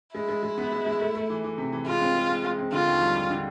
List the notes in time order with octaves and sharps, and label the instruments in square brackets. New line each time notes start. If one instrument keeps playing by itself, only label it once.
[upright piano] G#3 [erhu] E4
[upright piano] G#3
G#3
B3
G#3
G#3
A3
A3
E3
E3
C3
E3
[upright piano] G#3 [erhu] F4
[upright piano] C4
G#3
G#3
G#3
C4
[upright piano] D3 [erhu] F4
[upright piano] D#2
G3
G3
D3